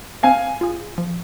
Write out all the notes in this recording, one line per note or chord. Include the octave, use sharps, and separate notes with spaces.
C4 F5 G#5
F4 G#4
F3